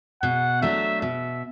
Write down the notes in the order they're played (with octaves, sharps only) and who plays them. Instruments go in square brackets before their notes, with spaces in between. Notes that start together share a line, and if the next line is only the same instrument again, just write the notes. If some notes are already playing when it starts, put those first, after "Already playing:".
[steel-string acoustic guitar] B2 [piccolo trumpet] F#5
[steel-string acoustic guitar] F#3 A3 D4 [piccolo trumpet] E5
[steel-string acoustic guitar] B2 [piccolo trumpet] E5